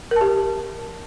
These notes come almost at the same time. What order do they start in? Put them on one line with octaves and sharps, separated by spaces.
A#4 A5 G4